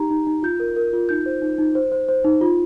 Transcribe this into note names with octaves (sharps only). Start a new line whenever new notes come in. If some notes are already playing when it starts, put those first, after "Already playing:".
Already playing: D#4 G4 A#5
D#4
D#4
F4 G6
A#4
A#4
F4
D#4 G6
C5
D#4
D#4
C5
C5
C5
D#4
F4